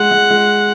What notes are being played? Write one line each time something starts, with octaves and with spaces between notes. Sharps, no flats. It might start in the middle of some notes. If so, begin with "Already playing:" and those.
Already playing: G#3 F#5
G#3
G#3